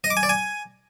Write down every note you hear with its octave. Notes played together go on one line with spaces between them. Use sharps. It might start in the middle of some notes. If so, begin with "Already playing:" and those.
D#5
D6
G#5
D5
G#5